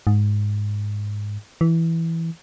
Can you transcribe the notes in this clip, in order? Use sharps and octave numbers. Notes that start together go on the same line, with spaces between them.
G#2
E3